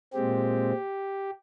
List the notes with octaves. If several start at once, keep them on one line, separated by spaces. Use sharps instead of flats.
A#2 G#3 C4 G4